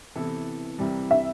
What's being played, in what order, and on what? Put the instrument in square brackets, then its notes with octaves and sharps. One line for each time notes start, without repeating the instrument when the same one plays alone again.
[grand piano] C3 E3 B3 E4 A4
C2 C3 E3 G3
[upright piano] E5